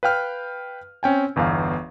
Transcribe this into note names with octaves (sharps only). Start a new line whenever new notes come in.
B4 F5 G5 F6
C4 C#4 G5 G#5
G1 E2 B4 F5